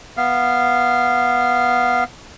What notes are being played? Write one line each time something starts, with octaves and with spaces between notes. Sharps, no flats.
B3 F5